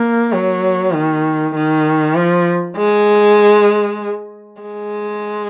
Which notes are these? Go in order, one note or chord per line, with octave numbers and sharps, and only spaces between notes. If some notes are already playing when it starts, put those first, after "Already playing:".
Already playing: A#3
F#3
D#3
D#3
F3
G#3
G#3